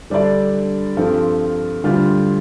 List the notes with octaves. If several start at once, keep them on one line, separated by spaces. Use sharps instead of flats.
D3 G3 D4 A4 D5
G2 F3 C4 A4
D2 D3 G3 F4